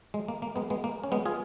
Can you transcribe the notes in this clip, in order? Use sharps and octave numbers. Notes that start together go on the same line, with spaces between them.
G#3
A#3
A#3
G#3 B3
G#3 B3
A#3
C#4
G#3 B3
F4 G#4